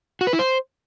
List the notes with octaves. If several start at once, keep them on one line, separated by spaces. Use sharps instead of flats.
F#4
B4
E4
C5